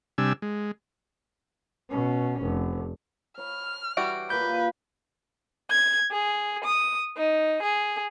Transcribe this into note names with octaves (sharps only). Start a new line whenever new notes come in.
C3 G3 D4 G#5 E6
G#3
B2 C#4
F1
C#5 B5 F6
E3 G3 F#4 D7
A#2 A#3 B4 G6
G#6
G#4
D#6
D#4
G#4